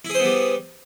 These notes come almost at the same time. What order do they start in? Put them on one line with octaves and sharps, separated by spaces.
E4 G#4 C5 B3 G3